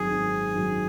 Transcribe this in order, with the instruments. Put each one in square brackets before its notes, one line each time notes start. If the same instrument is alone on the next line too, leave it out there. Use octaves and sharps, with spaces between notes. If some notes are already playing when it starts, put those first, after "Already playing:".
Already playing: [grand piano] G#1 F#2 D#3 F#3 [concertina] G#4
[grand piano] G#1
F#2 D#3 F#3